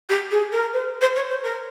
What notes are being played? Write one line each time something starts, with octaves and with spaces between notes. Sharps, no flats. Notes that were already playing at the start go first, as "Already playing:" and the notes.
G4
G#4
A#4
C5
C5
C#5
C5
A#4